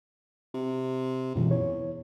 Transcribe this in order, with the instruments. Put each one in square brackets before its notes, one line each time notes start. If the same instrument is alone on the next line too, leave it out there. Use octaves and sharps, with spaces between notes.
[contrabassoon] C3
[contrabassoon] C#2 [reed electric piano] F#2 B2 E3
[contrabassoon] E2 [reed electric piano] C#5